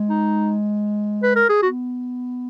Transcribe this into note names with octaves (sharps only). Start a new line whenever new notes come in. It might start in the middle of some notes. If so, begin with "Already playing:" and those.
Already playing: G#3
D#4
B4
A#4
G#4
B3 F#4